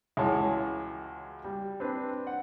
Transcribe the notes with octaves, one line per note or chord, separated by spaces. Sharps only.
C#2 E3 G#3 F#4 C#5 A5
G3
C4 D4 B4
F#5